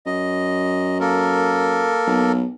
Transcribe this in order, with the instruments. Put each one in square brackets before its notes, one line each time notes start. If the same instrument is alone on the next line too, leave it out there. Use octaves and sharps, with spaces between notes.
[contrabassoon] F#2 [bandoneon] D#5
[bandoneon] A#3 A4 A#4
[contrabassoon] B1